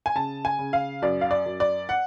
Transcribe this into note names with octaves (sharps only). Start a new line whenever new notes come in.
G#5
C#3 A5
G#5
C#3
F5
F#2 D5
F5
D5
F#2
D5
F#5